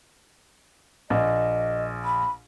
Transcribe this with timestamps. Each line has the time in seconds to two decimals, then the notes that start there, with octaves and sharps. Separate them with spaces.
1.10 A#1 D#5
2.04 B5